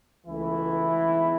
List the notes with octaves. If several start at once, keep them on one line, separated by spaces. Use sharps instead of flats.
C#2 B2 E3 A3 E4
B1 B2 G#3